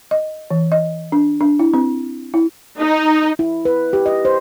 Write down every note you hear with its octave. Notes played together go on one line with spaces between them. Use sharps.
D#5
E3
D#5
D4
D4
E4
C4
E4
D#4
E4
B4
G4
D#5
C5